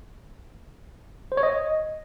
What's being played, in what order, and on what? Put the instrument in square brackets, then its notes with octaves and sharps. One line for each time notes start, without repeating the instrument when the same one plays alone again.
[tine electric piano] C5
C#5
D#5